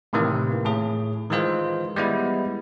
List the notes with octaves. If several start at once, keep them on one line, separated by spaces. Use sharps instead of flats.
A2 C3 D#3 E3 A#3
A2 G#4
D#3 E3 G#3 F4 C5
G3 G#3 B3 E4